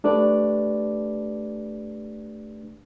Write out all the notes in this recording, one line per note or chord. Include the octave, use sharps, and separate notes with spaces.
A3 D4 G4 B4 D5